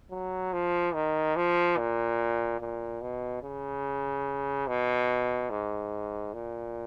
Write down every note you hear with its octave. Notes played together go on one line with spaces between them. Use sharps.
F#3
F3
D#3
F3
A#2
A#2
B2
C#3
B2
G#2
A#2